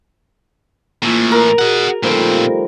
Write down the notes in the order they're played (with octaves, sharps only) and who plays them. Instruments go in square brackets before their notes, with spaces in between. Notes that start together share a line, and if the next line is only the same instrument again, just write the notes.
[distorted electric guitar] A2 E3 [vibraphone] A#3 F4 E6
[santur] A#4
[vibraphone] F#4 G#4 [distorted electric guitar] D#5 F#5
[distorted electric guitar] A#2 C4 [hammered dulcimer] D#3 F3 G3 [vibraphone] A3 A4